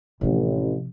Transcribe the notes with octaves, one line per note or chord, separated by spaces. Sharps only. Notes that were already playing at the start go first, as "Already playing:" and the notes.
A1 C3 F3